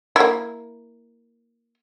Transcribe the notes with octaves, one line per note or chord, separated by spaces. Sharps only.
A#3 E4